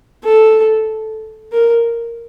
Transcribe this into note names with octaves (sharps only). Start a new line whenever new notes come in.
A4
A#4